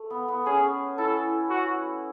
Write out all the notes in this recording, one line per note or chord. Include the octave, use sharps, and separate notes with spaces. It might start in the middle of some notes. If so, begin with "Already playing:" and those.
Already playing: A3
B3
B3
C#4 G#4
E4 A4
F#4